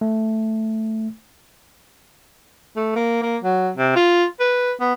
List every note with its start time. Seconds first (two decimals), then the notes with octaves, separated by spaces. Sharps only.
0.01 A3
2.77 A3
2.96 A#3
3.23 A#3
3.44 F#3
3.77 C3
3.96 F4
4.40 B4
4.80 B3